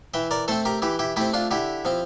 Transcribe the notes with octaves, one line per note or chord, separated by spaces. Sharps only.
E3 E5 G5
A#4 D5
A3 C4 A4 C5
G4 A#4
E3 E4 G4
E4 G4
A3 C4 E4 G4
D4 F4
D3 E4 G4
F3 C4